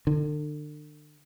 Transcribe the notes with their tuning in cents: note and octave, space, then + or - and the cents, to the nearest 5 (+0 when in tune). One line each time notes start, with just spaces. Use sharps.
D3 +35